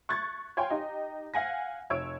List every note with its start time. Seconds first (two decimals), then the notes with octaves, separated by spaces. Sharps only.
0.09 C#6 F#6 G#6 A6
0.57 C#5 F5 G5 G#5 C6
0.70 D#4 G4
1.34 F5 F#5 G#5 A#6
1.90 F1 C#5 E6 D7